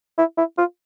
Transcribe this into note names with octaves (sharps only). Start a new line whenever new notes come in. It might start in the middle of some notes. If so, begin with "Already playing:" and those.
E4
E4
F4